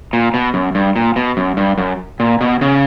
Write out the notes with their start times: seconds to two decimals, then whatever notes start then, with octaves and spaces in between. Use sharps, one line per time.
0.13 A#2
0.34 B2
0.54 F#2
0.75 G2
0.96 A#2
1.16 B2
1.37 F#2
1.57 G2
1.78 F#2
2.20 A#2
2.41 B2
2.61 C#3